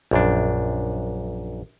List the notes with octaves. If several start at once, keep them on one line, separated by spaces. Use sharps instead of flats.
A#1 F#2 D4